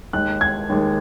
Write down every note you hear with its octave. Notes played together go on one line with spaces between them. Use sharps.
D#2 D#3 G#3 F#6
G#6
D#2 D#3 G#3